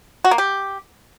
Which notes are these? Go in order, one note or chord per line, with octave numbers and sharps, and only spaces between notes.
F#4
A#3
G4